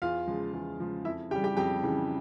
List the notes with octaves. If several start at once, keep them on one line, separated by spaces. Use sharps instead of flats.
E2 F4 F5
C#3 F3 G#3
E2
C#3 F3 G#3
F2 E4 E5
C#3 E3 G3 G4 G5
G4 G5
F2 G4 G5
C#3 E3 G3